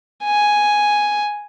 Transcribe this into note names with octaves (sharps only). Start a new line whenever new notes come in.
G#5